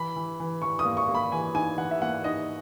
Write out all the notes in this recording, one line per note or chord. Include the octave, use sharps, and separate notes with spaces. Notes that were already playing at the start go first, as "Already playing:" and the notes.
Already playing: E3 B5
E3
E3
E3 C#6
D#6
A#3
C#6
A#3
B5
E3 G#5
D#4 G#5
E3 F#5
E5
A#3 F#5
D#4 D#5